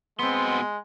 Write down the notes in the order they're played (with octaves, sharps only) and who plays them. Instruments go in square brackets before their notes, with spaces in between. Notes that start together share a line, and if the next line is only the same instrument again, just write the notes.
[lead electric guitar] B2 C6 [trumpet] G#3 [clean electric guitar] B3 C4